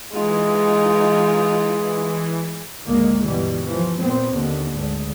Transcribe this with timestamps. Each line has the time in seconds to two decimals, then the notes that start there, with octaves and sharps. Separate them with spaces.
0.13 E3 G#3 D#4 F4
2.85 G#1 D2 D#3 G#3 A#3
3.22 G2 B2 E3 G3
3.63 E3 F3
3.99 A#2 B3 C4
4.28 D#2 D3
4.72 G#1 D2